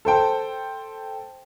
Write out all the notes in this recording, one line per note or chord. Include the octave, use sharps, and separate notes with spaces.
A4 C5 G5 A5